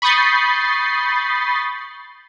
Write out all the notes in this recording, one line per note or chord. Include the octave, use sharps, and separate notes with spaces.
B5 C#6 D#6 G6 A6 C7